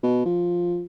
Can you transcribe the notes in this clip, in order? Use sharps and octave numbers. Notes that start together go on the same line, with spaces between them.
B2
F3